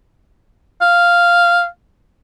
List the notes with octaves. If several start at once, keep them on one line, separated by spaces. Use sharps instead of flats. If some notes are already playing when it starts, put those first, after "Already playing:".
F5